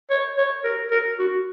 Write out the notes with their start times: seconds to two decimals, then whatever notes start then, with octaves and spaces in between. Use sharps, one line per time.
0.10 C#5
0.37 C#5
0.64 A#4
0.91 A#4
1.19 F#4